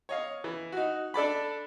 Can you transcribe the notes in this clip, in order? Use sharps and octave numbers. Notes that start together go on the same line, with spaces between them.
C#5 D#5 F5
E3
D#4 F#4
D4 A4 D5 B5